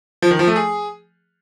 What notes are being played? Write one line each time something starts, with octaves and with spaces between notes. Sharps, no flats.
F3
D#3
F3
A3
G#4